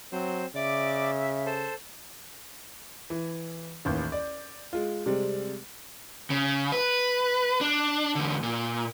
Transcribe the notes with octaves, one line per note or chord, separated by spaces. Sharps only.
F#3 C4 C5
C#3 D5 E5 D6
A4 C5
E3
A1 D#2 G6
D5
G#3 F4
C3 G3 G#3 C4
C#3
B4
D4
E2 D3
A#2